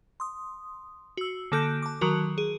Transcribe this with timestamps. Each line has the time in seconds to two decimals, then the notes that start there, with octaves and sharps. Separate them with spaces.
0.20 C6 D#6
1.17 F#4 E6
1.52 D3 A#3 A4 F#6 G6 D7
1.82 A5 D6
2.01 D#3 F#3 F#4 A#4
2.38 G#4